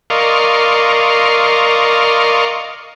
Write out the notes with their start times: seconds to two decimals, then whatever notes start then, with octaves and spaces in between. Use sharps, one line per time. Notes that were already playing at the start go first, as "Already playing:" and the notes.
0.10 A#4 D5 D#5 F5 C6 C#6